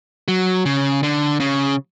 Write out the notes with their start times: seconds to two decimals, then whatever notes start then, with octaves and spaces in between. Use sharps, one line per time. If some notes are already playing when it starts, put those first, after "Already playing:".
0.28 F#3
0.66 C#3
1.03 D3
1.40 C#3